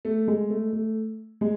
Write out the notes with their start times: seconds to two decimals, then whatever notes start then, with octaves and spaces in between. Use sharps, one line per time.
0.05 A3
0.28 G#3
0.50 A3
0.73 A3
1.41 G#3